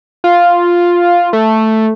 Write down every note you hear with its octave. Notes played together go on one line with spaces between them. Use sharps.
F4
A3